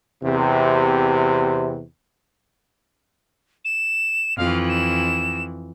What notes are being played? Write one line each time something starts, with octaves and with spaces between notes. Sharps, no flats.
E2 C3
E7
F2 E3 F5
E7